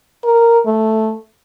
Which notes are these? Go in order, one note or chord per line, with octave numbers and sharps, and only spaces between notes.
A#4
A3